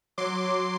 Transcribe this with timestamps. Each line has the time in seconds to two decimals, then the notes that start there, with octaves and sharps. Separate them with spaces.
0.18 F#3 C6 D6
0.44 F#3